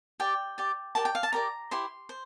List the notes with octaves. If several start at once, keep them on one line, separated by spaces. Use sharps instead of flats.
G4 D5 G5
G4 D5
G4 A#4 D5 A5
G5
F5
A5
G4 A#4 D5 A#5
E4 G4 C5 C6
C5